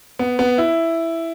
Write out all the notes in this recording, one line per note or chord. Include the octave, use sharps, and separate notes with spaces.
B3
B3
E4